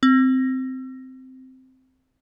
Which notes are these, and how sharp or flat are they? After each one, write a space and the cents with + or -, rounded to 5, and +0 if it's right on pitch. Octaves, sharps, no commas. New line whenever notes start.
C4 -10